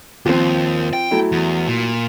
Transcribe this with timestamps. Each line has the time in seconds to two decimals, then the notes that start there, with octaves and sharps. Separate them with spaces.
0.26 D#2 F3 C4
0.93 G5
1.11 F#3 A3 E4
1.32 E2
1.68 A#2